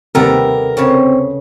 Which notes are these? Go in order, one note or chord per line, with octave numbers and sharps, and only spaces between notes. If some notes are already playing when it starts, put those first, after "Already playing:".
D#2 C3 G3 B3 A4 A#4
C#3 C4 C#5